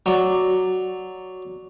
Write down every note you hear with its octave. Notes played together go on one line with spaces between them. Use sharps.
F#3 D5